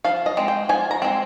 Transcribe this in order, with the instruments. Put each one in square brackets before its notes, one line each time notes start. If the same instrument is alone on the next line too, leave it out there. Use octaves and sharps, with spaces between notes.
[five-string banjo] F3 F5
D#5
G#3 C4
G5
F3 G#5
A#5
G#3 C4